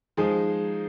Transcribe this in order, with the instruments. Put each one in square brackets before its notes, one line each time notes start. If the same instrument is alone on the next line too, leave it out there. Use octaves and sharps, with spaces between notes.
[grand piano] F3 G#3 D#4 G#4